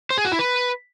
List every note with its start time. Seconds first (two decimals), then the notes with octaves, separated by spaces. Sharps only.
0.10 C5
0.18 G#4
0.25 F#4
0.32 E4
0.39 B4